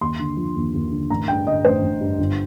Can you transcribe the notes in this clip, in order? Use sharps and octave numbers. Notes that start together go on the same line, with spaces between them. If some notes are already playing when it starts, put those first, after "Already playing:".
D#2 C6
D3
F3
D#2
D#2
D3
A1 A#5
G2 G5
D3 D#5
A1 C5
A1
G2
G1